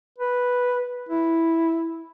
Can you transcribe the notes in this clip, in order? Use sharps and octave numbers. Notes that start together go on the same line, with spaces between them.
B4
E4